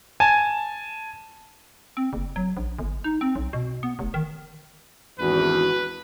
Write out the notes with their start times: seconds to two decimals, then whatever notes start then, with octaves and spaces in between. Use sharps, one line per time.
0.20 G#5 A5
1.97 C4
2.13 F#1
2.36 F#3
2.57 A#1
2.79 G1
3.04 D#4
3.21 C4
3.35 B1
3.53 B2
3.83 B3
3.99 F1
4.14 D#3
5.19 G#1 E2 C#4 D4 F#4 B4